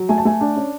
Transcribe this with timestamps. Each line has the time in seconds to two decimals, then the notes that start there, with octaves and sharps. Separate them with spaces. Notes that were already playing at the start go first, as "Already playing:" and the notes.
Already playing: F#3
0.09 A3 G#5
0.18 A5
0.25 A3 G#5
0.41 D4
0.56 C#4